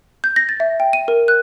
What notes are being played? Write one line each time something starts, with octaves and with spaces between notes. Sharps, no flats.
G6
A#6
A6
E5
G5
D#7
A#4
F#6